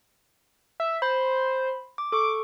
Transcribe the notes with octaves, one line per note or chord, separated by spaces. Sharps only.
E5
C5 B5
D6
A4 C#6 D6